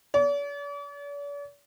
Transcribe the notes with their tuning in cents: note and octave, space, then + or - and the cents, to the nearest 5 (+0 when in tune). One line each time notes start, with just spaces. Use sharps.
D5 -45